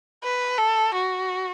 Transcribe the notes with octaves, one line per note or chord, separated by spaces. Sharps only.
B4
A4
F#4